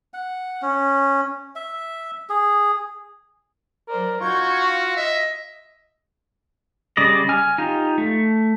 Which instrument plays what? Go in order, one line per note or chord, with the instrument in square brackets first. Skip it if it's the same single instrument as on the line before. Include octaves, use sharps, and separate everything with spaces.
[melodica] F#5
C#4
E5
G#4
[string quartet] F#3 C5 D5 [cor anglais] A#4
[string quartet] D#4 G6 G#6 [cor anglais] F4 [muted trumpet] F#4 [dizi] C#6
[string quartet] F5
[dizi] D#5 [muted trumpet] E5
[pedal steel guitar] C#3 G3 D5 D#5
G#5 F6
D#4 F4 G4
A3